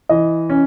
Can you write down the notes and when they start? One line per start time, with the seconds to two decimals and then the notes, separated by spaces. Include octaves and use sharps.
0.09 E3 D#5
0.50 C#4